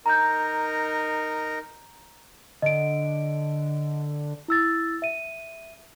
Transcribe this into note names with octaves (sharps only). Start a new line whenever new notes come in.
D#4 A#4 A#5 G6
D3 D#5 D7
E4 E6 A6
E5 D#7